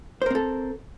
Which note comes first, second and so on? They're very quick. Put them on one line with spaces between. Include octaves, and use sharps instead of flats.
C5 A#4 C4 A4